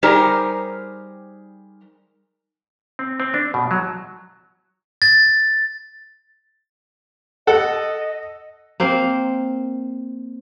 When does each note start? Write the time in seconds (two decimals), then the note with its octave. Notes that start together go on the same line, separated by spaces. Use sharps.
0.03 G3 D#4 G4 G#4 A#4 C5
2.99 C4
3.20 C4
3.34 D4
3.54 B2
3.71 F#3
5.02 A6
7.47 A4 D#5 F#5
8.80 A#3 C4 C5